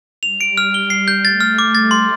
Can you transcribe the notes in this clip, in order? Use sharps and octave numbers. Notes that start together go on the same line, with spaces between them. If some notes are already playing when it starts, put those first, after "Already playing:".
G3 F7
D7
F6
G7
C7
G6
A3 A6
F6
D6
G3 A6
C6